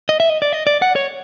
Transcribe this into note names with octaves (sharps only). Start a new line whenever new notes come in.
D#5
E5
D#5
D5
D#5
D5
F#5
C#5